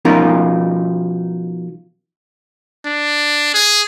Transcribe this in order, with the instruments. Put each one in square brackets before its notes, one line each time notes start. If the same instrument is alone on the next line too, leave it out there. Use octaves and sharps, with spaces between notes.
[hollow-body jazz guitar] B2 F3 C#4 D#4 F4 A#4
[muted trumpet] D4
G#4